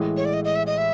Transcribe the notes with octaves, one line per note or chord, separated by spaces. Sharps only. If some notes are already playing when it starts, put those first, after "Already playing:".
Already playing: A1 A2 E3 G#3
C#5
D5
D#5
D#5
E5
D#5
E5